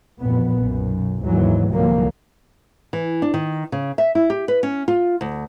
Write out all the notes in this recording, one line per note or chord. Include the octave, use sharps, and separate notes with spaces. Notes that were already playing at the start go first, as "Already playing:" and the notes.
A1 F2 A#2 B3
B1 F#2
D#2 G#2 E3 F#3
C2 G#2 D3 F3 F#3 A#3
E3
D4
D#3
C#3
E5
E4
G4
B4
C#4
F4
D2